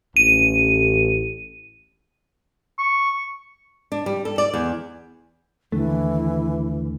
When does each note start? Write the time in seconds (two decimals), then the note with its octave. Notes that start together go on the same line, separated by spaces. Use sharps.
0.16 A1 D#7
2.78 C#6
3.92 D4
4.06 G3
4.25 A4
4.38 D5
4.53 E2
5.72 D#2 D3 E3 A3